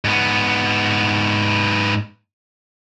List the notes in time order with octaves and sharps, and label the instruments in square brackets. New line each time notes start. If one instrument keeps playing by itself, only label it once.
[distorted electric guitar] G#2 B3